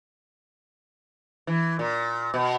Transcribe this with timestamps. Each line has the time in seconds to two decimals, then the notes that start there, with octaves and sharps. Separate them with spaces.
1.47 E3
1.79 A#2
2.34 B2